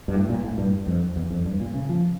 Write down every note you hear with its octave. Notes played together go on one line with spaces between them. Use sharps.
G2
A2
A#2
A2
G2
F2
E2
F2
G2
A#2
C#3
F3